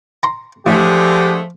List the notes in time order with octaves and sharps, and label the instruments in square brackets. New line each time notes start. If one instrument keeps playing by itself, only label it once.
[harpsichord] A#5 C6
[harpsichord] A1 [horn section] D3 G#3 A3 [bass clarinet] F3 [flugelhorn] G4